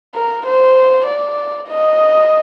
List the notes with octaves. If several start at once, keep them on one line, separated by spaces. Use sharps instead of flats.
A#4
C5
D5
D#5